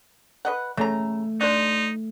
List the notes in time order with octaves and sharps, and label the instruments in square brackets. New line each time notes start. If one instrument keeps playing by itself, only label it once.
[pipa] B4 D#5 F#5
[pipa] C#3 A#5 [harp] A3
[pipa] D4 C5 [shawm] D#4